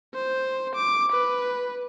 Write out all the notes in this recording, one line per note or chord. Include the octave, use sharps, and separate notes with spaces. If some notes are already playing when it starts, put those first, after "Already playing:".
C5
D6
B4